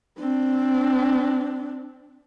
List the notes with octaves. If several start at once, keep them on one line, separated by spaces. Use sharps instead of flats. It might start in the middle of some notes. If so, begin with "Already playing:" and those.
C4 D4